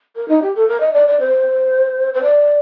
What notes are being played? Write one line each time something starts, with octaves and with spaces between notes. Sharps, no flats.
A#4
D#4
G4
A4
A#4
D#5
D5
D5
C5
C5
D5